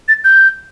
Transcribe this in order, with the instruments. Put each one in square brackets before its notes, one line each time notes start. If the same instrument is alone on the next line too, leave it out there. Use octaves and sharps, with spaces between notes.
[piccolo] A6
G6